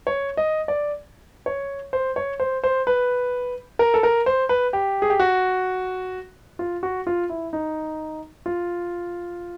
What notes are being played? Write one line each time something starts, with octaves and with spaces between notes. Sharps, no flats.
C#5
D#5
D5
C#5
C5
C#5
C5
C5
B4
A#4
A4
A#4
C5
B4
G4
G#4
G4
F#4
F4
F#4
F4
E4
D#4
F4